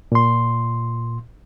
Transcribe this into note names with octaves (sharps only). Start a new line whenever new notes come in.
A#2 C6